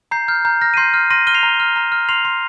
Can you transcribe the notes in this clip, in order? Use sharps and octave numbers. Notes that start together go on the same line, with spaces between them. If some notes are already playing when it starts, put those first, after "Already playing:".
A#5 G6 C7
F6 G6
A#5 G6
F6 A#6
D#7
C6 G6 C7
F6
C6 A#6 D#7
F6 D#7 G7
C7 F7
A#5
F6
A#5
F6
C6 C7 F7
C6